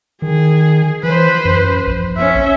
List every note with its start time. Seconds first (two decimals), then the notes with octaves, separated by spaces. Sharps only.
0.22 D#3 G#4
1.03 E3 B4 C5
1.45 F#2
1.87 A#1
2.17 C#4 E5